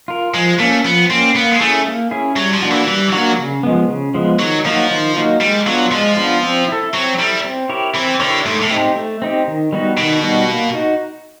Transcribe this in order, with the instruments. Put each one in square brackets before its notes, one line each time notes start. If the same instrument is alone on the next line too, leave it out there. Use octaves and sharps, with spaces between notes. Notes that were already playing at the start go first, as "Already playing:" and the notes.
[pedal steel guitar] F4 A#4
[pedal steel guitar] F3 [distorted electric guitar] G#3
[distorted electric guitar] A3 [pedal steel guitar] A#3 C#4
[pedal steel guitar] F3 [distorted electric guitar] B3
[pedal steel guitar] A#3 C#4 [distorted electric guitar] C4
[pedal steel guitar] A#3 [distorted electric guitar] B3
[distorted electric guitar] G#3
[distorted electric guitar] A3 [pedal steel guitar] C#4 E4 G#4
[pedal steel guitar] A#3
C#4 E4 G#4
[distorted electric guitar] F#3 [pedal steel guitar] G3
[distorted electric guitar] F3
[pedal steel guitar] A#3 D4 F#4
[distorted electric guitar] E3
[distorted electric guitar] E3 [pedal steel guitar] G3
[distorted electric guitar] F#3 [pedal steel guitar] A#3 D4 F#4
[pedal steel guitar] C#3
F3 G#3 B3
C#3
F3 G#3 B3
[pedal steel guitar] D#3 [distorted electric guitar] F#3
[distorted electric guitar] F3 [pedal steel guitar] F#3 A#3 D#4 F#4
[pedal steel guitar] D#3
F#3 A#3 D#4 F#4
[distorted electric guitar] G3 [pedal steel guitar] G#3
[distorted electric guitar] F#3 [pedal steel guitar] B3 D4 F4
[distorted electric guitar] F3 [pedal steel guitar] G#3
[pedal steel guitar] B3 D4 F4
C4
E4 A4
[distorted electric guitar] F#3 [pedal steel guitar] C4
[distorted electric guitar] G3 [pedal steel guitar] E4 A4
[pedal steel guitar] C4
E4 G4 A#4 C#5
[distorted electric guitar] E3 [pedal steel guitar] C4
[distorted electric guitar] D3 [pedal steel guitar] E4 G4 A#4 C#5
[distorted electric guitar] G#2 [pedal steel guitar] A3
[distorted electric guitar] A2
[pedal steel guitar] C4 D#4 G4
A3
C4 D#4 G4
D#3
G3 B3 D#4 F#4
[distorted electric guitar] B2 [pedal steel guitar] D#3
[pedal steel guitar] G3 B3 D#4 F#4
A#3
D#4 F#4